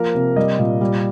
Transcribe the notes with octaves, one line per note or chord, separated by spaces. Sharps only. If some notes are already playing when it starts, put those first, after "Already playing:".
Already playing: F3 A#3 A#4
C3
G3 D#5
A#2
G3